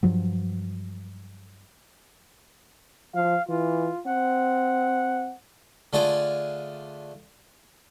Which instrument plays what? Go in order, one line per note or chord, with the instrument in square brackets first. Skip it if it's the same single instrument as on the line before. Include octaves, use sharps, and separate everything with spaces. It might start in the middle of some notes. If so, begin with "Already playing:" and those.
[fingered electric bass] G2 F3 F#3
[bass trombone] F3 [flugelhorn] F5
[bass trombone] E3 [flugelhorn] F4
[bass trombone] C4 [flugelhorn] F#5
[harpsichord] D3 A3 D4 F4 G#4